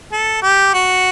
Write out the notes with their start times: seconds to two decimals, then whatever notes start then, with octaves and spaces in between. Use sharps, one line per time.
0.12 A4
0.42 G4
0.74 F#4